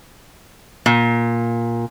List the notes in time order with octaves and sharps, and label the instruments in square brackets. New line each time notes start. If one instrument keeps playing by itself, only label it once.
[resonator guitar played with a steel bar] A#2